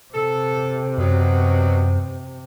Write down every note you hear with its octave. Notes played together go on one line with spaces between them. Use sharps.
C3 A4
F#2 B2 F#3